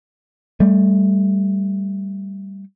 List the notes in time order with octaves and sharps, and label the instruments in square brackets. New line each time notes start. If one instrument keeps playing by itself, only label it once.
[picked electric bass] G3 A3